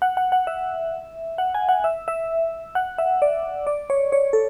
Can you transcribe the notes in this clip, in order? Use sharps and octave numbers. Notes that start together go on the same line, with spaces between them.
F#5
F#5
F#5
E5
F#5
G#5
F#5
E5
E5
F#5
E5
D5
D5
C#5
C#5
A4